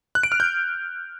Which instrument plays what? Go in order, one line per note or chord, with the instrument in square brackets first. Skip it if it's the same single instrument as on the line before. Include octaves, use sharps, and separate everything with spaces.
[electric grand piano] F#6
D7
F6
G6